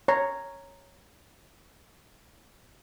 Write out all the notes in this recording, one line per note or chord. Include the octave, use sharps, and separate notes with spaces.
C#5 A#5